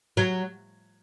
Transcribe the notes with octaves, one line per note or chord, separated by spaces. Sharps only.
F#3